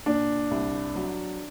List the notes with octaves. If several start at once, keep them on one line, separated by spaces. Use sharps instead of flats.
A#2 D4
C2
F#3